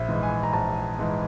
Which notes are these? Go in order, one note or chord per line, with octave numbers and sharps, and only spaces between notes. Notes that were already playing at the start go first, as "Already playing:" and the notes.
Already playing: A#1 E5
G#2 E3
G#5
A#5
A#1 A5
G#2 E3